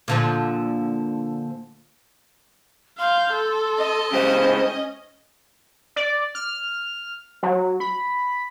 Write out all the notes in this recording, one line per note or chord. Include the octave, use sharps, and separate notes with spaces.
A#2 D3 F3
F5 C6 G6
A4
D#5
C#2 C#4 G4 C5
D5
F6
F#3
B5